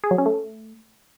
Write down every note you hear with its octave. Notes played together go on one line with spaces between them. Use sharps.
G#4
F#3
C#4
A3